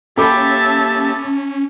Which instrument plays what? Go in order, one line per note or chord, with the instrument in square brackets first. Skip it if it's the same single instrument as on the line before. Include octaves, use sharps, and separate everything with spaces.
[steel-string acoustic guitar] A#3 G4 A4 [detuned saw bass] C#4 [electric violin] E5 A5 [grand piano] B5 D6